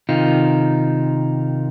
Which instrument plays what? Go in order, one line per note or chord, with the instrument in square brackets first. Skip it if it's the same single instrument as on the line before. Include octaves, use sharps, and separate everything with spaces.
[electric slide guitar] C3 D#3 D#4 F4